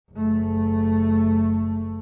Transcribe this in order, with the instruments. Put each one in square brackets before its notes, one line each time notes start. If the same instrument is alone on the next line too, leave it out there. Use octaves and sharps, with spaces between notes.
[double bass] F#1 A3